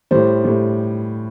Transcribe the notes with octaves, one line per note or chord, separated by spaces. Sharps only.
A2 G3 C5
A2 G3